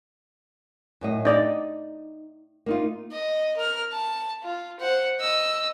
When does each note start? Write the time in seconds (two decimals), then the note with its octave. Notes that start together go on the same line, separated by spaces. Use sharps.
1.01 F#2 A2 D#5
1.25 D#4 D5 D#5
2.66 A#3 D#4 F4
3.11 D#5
3.57 A#4 F6
3.92 A5
4.43 F4
4.80 C5 F#5
5.19 D#5 E6